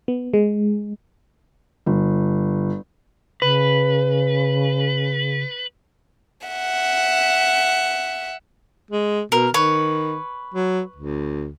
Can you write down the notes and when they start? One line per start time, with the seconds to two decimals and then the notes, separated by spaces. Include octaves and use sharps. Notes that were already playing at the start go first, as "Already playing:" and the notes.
0.08 B3
0.34 G#3
1.86 G1
3.42 C#3 B4
6.47 E5 F#5
8.91 G#3
9.32 B2 A#4
9.54 D#3 B4 C#5
10.54 F#3
10.96 D2